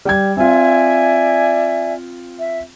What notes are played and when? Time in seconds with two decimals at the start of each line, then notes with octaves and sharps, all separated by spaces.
0.05 G3 G5 G#6
0.37 C4 F4 D5 E5 G#5
2.39 E5